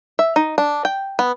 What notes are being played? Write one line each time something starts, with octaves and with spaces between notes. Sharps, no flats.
E5
D#4
D4
G5
B3